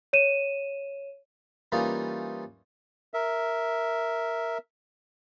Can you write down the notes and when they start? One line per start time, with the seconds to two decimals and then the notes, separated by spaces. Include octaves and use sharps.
0.13 C#5 D#7 E7
1.72 E3 G3 A#3 C#4 D#4 F4
3.14 A#4 E5